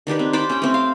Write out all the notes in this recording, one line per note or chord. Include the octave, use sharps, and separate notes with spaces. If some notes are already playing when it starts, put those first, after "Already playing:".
D#3 D4 G4 B4
C4
C5 D5 B5 D6
C#4 G5
A3 C4
F5